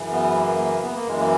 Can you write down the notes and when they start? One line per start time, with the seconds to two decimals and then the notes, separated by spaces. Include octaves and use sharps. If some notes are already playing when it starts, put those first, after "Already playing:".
Already playing: F#2 C#3 E3
0.12 B3
0.35 A#3
0.59 A#3
0.82 B3
0.96 A#3
1.07 F#2 E3 G#3
1.20 A#3